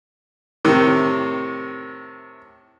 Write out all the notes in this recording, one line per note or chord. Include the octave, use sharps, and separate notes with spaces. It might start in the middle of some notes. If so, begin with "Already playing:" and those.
A2 C3 D#3